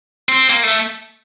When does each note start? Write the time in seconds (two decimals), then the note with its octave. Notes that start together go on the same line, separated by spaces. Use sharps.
0.29 C4
0.49 A#3
0.63 A3